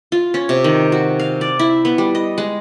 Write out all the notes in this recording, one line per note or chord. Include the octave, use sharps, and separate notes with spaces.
F4
C#4
C3
D#3
F#4
F5
D5
E4
B3
G3
D#5
G#3